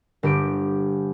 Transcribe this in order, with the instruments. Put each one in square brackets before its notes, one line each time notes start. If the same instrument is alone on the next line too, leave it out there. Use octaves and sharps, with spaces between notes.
[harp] G1 G4 D7